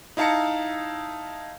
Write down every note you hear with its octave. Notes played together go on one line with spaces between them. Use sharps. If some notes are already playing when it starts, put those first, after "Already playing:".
D#4 E4 F5 A5 A#5 C#7